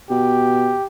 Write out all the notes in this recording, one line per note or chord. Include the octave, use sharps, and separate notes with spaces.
B2 G4